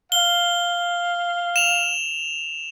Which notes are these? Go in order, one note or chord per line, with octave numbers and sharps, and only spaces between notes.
F5 G7
E7 F7